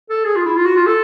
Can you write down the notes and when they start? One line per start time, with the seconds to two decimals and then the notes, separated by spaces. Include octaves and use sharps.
0.09 A4
0.25 G#4
0.35 F4
0.46 E4
0.56 F4
0.66 F#4
0.76 F4
0.86 A4